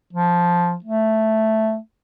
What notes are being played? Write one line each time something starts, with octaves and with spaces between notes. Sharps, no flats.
F3
A3